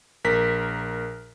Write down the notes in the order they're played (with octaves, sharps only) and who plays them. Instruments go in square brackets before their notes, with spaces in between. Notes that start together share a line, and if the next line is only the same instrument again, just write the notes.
[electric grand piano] A#1 A#4 B6